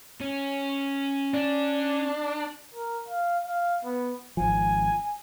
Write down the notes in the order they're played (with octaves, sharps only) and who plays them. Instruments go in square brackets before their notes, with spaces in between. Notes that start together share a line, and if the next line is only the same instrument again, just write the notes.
[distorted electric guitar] C#4
[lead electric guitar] D4
[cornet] A#4
F5
F5
B3
[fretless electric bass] G#1 F3 [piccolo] G#5